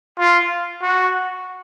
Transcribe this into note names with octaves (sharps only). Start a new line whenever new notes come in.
F4
F#4